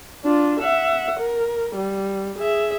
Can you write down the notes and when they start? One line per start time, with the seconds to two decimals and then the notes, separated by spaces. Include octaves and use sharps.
0.25 D4 F4
0.60 E5 F#5
1.20 A#4
1.76 G3
2.38 G#4 E5